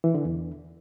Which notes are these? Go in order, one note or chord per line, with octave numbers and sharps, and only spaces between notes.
E3
D3
E2